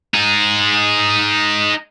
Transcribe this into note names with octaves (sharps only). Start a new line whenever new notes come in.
D#4 G#4